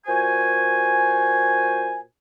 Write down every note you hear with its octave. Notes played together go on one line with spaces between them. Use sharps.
A#2 F#4 C5 G#5